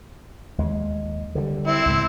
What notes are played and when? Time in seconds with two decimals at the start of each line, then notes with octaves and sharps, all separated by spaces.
0.58 D#2 G#3
1.35 D3 E3 G3
1.67 C4 E4
1.86 C#2 A2